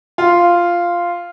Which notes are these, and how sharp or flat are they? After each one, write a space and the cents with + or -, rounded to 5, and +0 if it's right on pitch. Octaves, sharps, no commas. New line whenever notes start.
F4 -5